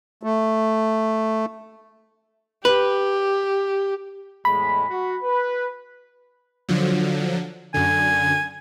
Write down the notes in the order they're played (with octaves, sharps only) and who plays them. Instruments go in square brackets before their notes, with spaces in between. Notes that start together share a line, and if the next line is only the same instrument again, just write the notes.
[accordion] A3
[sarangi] G4 [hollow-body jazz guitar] B4
[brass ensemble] E2 A2 G#3 [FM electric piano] B5
[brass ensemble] F#4
B4
[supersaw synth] D3 F3 F#3
[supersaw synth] F#2 D3 [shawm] G#5